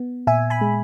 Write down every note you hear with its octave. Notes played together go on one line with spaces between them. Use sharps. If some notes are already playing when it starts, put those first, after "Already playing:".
Already playing: B3
A#2 E5 G#5
G#5 B5
G#3